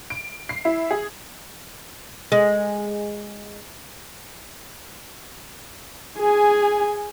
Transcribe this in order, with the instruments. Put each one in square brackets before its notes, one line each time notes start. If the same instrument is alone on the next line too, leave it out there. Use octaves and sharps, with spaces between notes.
[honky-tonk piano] D7
C7
E4
G#4
[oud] G#3
[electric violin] G#4 G#5